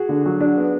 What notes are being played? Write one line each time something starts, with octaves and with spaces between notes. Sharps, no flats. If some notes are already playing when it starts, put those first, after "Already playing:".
Already playing: F#4 G#4
D3
F#3
D4
B3